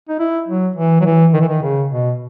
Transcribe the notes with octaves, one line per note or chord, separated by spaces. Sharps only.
D#4
E4
F#3
E3
F#3
E3
D#3
E3
D#3
C#3
B2